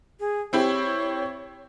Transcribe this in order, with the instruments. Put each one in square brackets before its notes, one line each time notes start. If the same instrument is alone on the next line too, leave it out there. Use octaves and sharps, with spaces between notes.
[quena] G#4
[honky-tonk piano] C4 E4 G4 [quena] C#5